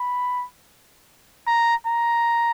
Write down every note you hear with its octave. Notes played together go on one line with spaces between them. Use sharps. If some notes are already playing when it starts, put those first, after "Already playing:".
Already playing: B5
A#5
A#5